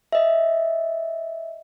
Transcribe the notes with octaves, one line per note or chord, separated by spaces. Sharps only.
D#5 E5